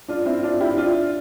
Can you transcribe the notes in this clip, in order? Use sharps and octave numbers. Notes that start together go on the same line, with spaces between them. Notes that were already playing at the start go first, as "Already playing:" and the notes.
D4 F4
C4 E4
D4 F4
E4 G4
D4 F4